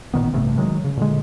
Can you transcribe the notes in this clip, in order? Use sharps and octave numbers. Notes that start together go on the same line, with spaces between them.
A1 A#2 D#3 B3
A1 G2 C3 A3
D#3 F#3 G#3
C#3
A#2 D3 G#3